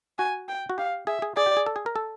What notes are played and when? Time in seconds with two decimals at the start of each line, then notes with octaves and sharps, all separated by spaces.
0.18 F#4 G#5
0.48 G5
0.70 F#4
0.78 G4 F5
1.07 G#4 E5
1.22 G#4
1.37 G#4 D5
1.46 G4
1.57 G#4
1.66 A4
1.76 G#4
1.86 A#4
1.96 A4